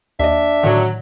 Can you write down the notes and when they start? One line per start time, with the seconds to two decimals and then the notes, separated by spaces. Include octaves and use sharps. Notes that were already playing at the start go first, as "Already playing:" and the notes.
0.20 D#2 D4 D#5 E5
0.63 A2 D3 D#3 F#3